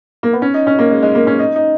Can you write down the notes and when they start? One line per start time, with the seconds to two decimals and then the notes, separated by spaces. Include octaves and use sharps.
0.23 A#3
0.33 B3
0.42 C#4
0.54 D#4
0.67 C#4
0.79 A#3
0.91 G#3
1.03 G#3
1.15 A#3
1.27 C#4
1.39 D#4
1.56 D#4